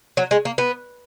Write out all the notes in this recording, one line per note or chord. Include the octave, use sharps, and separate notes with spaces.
F#3
G#3
A#3
B3